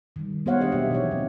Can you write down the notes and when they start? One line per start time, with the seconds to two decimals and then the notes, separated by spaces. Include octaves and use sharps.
0.16 D#3 G3
0.46 B3 F#4 C5 C#5 F5 F#5
0.60 D4 G4 G#4 D#5
0.72 B2 F#3 A#3 G4 E5
0.91 E3 D#4 C#5
1.11 D3 F#3 C4